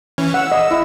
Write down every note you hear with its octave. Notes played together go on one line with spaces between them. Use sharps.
E3 C#4
F#5 E6
D#5
E4